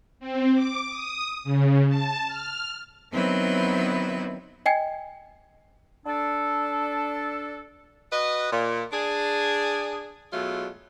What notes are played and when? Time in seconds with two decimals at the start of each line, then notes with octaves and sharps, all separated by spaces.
0.20 C4
0.54 D6
0.90 D#6
1.44 C#3
1.89 A5
2.28 F6
3.12 D#3 F#3 B3 C4 E4 B4
4.66 D#5 G5 G#5 G#6
6.07 D4 A4
8.12 F#4 B4 D#5
8.52 A#2
8.92 D4 G#4
10.33 B2 F#3 G#3 A3 F4